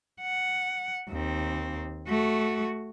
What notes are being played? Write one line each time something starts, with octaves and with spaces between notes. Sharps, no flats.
F#5
D#2 C4
A3 F#4